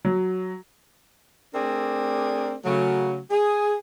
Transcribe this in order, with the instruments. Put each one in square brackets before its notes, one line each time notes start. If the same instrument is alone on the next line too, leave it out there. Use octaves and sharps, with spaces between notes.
[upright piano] F#3
[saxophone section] A3 C4 D4 G#4 A#4 D5
C#3 F#3 A3
G#4